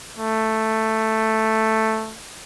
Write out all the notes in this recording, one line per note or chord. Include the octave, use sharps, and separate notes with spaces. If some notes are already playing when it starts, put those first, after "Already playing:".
A3